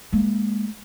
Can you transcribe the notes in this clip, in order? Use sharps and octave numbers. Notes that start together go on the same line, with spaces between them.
G#3 A#3